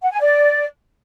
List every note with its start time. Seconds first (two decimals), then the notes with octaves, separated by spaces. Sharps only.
0.02 F#5
0.11 G#5
0.21 D5